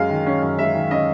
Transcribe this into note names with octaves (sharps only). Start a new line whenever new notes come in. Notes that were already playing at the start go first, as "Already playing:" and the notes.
Already playing: F#2 G#3 F5
D#3
C#4
F#2
G#3 E5
D#3
C#4 D#5